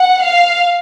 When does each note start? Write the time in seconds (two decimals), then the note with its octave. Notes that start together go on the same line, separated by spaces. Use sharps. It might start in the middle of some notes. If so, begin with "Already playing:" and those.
Already playing: F#5
0.23 F5